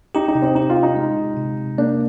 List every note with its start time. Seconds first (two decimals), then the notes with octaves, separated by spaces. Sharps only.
0.15 D#4 G4
0.28 D#4
0.35 C3
0.42 C4
0.55 D#4 G4
0.70 F4
0.77 G4
0.83 D#4
0.96 G#3
1.17 C3
1.36 C3
1.57 C3
1.78 A#3 D4